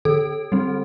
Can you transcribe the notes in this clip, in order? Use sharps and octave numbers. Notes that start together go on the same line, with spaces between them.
D3 A4
G3 C4